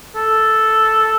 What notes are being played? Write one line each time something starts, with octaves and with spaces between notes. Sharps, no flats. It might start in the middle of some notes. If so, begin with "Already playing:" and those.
A4